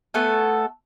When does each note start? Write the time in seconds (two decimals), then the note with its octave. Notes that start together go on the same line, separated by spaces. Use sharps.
0.14 A3 B3 A4 G#5